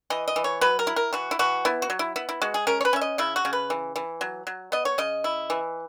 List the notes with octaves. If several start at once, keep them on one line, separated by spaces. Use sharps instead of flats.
E3 D#5
D#5
E3
C#5
F#3 B4
A#4
E4
A#4
E3 F#4
E4
E3 F#4
B3 E4
F#4
F#3
E4
B3 E4
E4
G#3 F#4
G#4
C#4 A#4
C#5
B4
C#4 E5
D#5
C#3 E4
F#4
C#3
B4
E3
E3
F#3
F#3
B3 D#5
C#5
C#3 D#5
E4
E3